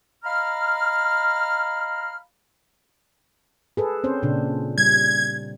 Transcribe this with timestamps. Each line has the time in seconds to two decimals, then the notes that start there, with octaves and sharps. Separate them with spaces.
0.24 D#5 F5 A#5 B5 F6
3.77 G#4 A4 B4
4.04 C4 C#4 C5
4.23 A#2 C#3 D4
4.78 G3 G#6